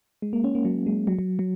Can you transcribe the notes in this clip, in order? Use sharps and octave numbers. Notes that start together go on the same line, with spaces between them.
G#3
A#3
C#4
A#3
F#3
G#3
F#3
F#3
F#3